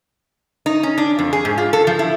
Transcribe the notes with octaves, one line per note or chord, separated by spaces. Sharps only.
D#4
C#4
D4
F2
G#4
G#2
F4
A4
F3
E4